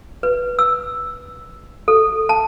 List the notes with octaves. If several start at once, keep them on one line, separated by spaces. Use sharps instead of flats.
B4
E6
A4
A5